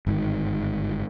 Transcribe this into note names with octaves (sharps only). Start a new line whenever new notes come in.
G1 G#2 B2 D#3